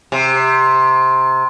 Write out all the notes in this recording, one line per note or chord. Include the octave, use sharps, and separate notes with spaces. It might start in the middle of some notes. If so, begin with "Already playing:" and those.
C3